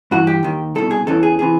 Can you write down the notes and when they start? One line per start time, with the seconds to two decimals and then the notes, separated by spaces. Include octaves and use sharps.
0.11 G2 E3 F#4
0.27 G4
0.43 D#2 D#3
0.75 C2 B2 A4
0.91 G#4
1.07 E2 C#3 E3 A4
1.23 G#4
1.39 C3 E3 G#4